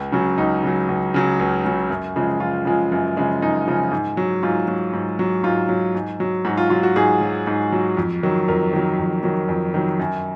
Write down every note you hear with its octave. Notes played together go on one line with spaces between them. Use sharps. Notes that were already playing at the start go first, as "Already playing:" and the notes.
Already playing: C#2
C#3 F#3
C#2 D#4
C#3 F#3
C#2
C#3 F#3
C#2
C#3 F#3
F#2
C#3 F3 G#3
F#2 F4
C#3 F3 G#3
F#2
C#3 F3 G#3
F#2 D#4
C#3 F3 G#3
G#2
F#3
G#2 F4
F#3
G#2
F#3
G#2 F4
F#3
G#2
F#3
G#2 F#4
F4
F#3 F4
F#4
G#2 G#4
F#3
G#2
F#3
F2
D#3 F#3
F2 A#4
D#3 F#3
F2
D#3 F#3
F2
D#3 F#3
F#2